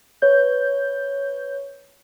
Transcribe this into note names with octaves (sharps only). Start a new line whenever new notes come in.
B4 C#5 G6